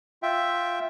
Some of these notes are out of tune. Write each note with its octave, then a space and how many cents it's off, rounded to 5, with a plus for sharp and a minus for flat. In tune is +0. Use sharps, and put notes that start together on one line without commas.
F4 +0 E5 +0 G5 +0